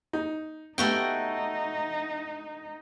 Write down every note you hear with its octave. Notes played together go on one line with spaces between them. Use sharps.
D#4
A3 B3 D#4 F#4 G4 G5